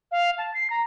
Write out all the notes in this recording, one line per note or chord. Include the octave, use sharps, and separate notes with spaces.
F5
A5
C7
A#5